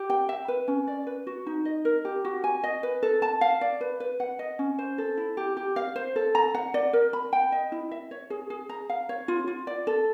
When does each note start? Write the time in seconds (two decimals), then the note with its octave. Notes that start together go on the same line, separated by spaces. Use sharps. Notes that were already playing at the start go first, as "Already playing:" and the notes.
Already playing: G4
0.10 G5
0.29 E5
0.48 B4
0.68 C#4
0.87 D5
1.07 B4
1.27 F#4
1.47 D#4
1.65 D#5
1.85 A#4
2.05 G4
2.25 F#4
2.44 G#5
2.64 D#5
2.83 B4
3.03 A4
3.22 A5
3.41 F5
3.61 D5
3.81 B4
4.00 B4
4.20 F#5
4.39 D#5
4.59 C#4
4.79 C5
4.98 A4
5.17 E4
5.37 G4
5.57 G4
5.76 F5
5.96 C5
6.16 A4
6.35 A#5
6.55 F#5
6.74 D5
6.93 A#4
7.13 B5
7.33 G5
7.52 D#5
7.72 E4
7.91 E5
8.11 C#5
8.30 G#4
8.50 G#4
8.69 A#5
8.90 F5
9.09 C#5
9.28 F4
9.48 F4
9.67 D5
9.87 A4